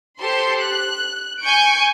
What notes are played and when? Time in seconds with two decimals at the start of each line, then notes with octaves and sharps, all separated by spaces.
0.19 G4 A4 C5 C6
0.60 F#6
1.41 G#5 C#6 G6 C#7 D7